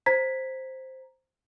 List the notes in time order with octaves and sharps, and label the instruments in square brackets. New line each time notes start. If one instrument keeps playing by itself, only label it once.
[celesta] C5 A#5 G#6 B6